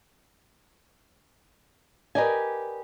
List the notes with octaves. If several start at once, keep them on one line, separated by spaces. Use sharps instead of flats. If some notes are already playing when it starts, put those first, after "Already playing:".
G4 A#4 B4 D5 D#5 G#5